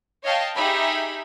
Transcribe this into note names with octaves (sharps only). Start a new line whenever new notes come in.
C#5 D#5 F5 G5 A5
D#4 G4 G#4 E5 B5